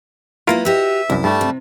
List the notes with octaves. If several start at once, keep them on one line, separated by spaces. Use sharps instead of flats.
F#3 A#3 B3 E4 F4 A#4
F#4 G4 D#5 E5
C2 F#2 E4
G2 G3 A3 A5
C3